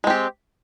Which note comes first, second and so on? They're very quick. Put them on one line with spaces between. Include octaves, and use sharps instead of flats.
G#3 C4 G4